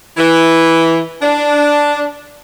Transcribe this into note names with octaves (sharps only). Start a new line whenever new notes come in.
E3
D4